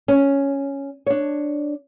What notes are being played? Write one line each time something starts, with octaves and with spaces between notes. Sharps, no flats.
C#4
D4 C#5